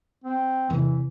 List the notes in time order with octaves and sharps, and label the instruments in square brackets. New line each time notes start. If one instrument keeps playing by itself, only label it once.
[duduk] C4
[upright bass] E2 C3 [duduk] E3